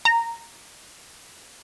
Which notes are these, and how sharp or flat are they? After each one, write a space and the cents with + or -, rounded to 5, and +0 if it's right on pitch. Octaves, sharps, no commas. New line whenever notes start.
A#5 -10